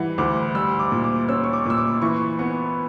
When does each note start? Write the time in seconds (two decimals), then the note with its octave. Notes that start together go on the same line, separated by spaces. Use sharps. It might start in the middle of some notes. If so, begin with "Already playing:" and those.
Already playing: E3 G3 F#5
0.18 D2 D6
0.55 G3 E6
0.79 D6
0.92 A#2
1.04 D6
1.29 C#4 E6
1.44 C#6
1.53 D6
1.66 A#2 E6
1.78 D6
2.02 E3 C#6
2.39 B3 C#6